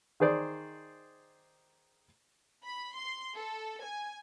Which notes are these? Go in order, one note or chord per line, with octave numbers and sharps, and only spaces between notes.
D#3 G#4 C5 D5
B5
C6
A4
G#5